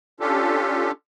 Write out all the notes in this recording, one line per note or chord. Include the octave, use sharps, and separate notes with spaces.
C#4 D4 F4 G4 A4